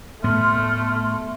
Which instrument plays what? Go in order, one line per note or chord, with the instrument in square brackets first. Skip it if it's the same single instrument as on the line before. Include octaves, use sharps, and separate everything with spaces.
[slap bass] A2 B3 [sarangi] A3 [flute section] C6 F6